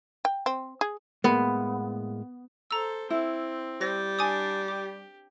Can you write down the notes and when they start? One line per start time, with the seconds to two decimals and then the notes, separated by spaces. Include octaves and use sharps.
0.25 G5
0.46 C4
0.81 G#4
1.24 A2 G#3 A#3 B3
2.71 A4 C5 A#5 E6
3.10 C4 E4
3.81 G3 C5 A#6
4.19 D4 G#5 D6 D#6
4.68 G4 D6